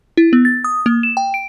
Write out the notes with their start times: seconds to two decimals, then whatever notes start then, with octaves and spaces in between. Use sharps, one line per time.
0.17 E4
0.33 B3
0.45 A6
0.64 D#6
0.86 A#3
1.03 E7
1.17 G5
1.34 D7